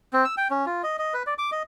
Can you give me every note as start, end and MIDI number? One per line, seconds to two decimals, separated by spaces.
0.13 0.25 60
0.25 0.35 88
0.37 0.48 79
0.50 0.65 61
0.66 0.82 65
0.83 0.97 75
0.99 1.14 75
1.14 1.23 71
1.27 1.34 74
1.38 1.50 86
1.52 1.63 75